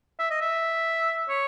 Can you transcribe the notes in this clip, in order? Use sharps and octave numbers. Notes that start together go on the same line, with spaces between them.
E5
D#5
E5
C#5